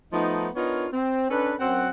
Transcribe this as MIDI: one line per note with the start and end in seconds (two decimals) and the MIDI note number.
0.13 0.49 53
0.13 0.49 57
0.13 0.49 59
0.13 0.49 63
0.56 0.87 59
0.56 0.87 62
0.56 0.87 63
0.56 0.87 65
0.56 0.87 70
0.56 0.87 73
0.93 1.30 60
1.30 1.55 61
1.30 1.55 62
1.30 1.55 69
1.30 1.55 71
1.60 1.89 42
1.60 1.89 60
1.60 1.89 78